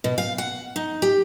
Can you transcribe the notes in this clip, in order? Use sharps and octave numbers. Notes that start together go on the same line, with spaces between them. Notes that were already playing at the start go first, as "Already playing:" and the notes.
B2
F5
F#5
D#4
G4